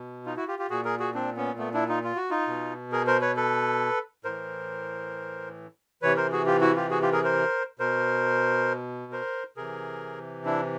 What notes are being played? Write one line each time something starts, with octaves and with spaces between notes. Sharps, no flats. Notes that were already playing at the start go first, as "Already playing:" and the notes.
Already playing: B2
D#4 F4
E4 F#4
F4 G4
F4 G4
A#2 F#4 G#4
G#4 A#4
F#4 G#4
C4 D4
B3 C#4
A3 B3
D4 E4
D#4 F4
F4
F#4
D#4 F4
B2
G#4 A#4
A#4 C5
B4 C#5
A4 B4
A2 E3 A#4 C5
C3 E3 B4 C#5
A#4 C5
F#4 G#4
F4 G4
E4 F#4
F4 G4
F#4 G#4
F4 G4
G#4 A#4
A#4 C5
B2 A#4 C5
A#4 C5
C3 E3 G#4 A#4
D4 E4